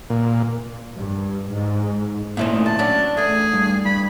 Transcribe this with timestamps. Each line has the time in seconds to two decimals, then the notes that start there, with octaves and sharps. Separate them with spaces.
0.10 A#2
0.98 G2
1.50 G#2
2.37 A#2 D#3 A3 C#4 E4 C5
2.66 C3 A5
2.79 F#3 C#4 D4
3.17 E2 A3 G#4
3.53 G2
3.85 G2 B5